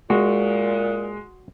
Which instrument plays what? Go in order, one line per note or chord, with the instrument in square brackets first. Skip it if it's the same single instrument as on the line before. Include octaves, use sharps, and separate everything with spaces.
[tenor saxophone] A#2 [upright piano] G#3 [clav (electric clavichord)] F#4